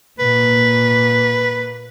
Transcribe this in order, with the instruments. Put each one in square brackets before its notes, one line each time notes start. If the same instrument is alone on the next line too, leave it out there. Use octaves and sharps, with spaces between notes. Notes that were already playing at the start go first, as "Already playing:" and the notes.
[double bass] A#2 A#3 [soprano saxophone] B4